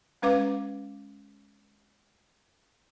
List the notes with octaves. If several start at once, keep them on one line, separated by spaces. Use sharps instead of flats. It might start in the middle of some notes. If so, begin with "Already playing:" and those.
G#3 C#4 B4 F5 D6